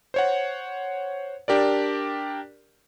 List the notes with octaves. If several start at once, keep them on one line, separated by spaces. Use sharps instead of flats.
C5 C#5 F#5
D4 G4 A#4 D5